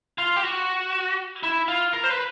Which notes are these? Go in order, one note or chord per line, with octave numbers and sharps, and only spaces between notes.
F4
G4
F#4
E4
F4
A#4
C5
B4